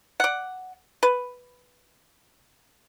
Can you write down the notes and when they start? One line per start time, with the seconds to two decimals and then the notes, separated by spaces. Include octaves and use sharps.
0.20 D5 F#5
1.03 B4